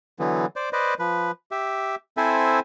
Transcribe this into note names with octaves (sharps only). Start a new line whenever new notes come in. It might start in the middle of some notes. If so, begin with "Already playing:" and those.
D3 E3 F#3 B3
C5 D5
B4 C5 D5 D#5
F3 B4
G4 E5
C4 E4 A4 C5 E5 G#5